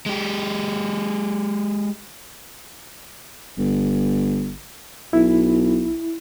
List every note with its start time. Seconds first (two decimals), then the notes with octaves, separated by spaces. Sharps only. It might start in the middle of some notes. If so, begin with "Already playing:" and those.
0.06 G#3 G4
3.58 G1
5.13 B1 E4